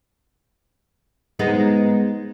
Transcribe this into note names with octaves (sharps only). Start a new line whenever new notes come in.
G#3 B3 D#4